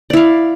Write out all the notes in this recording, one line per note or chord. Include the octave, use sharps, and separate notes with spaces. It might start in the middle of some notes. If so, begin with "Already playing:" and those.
E4 D5 F5